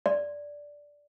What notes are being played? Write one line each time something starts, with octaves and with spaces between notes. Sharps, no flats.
D5